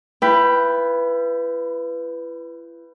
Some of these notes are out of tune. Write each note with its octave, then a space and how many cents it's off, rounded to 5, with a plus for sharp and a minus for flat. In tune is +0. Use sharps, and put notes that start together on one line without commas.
E4 +40 B4 +0 G5 +0